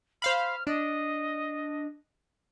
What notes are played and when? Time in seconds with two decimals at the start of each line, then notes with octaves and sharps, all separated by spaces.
0.22 C5 F5 B5 F6
0.67 D4 D#5